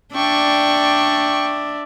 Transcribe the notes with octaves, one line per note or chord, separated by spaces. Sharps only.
D4 D5 E5 G5 C#6